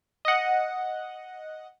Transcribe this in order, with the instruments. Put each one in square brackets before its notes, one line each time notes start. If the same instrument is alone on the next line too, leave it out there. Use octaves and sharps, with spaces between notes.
[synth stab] D#5 F#5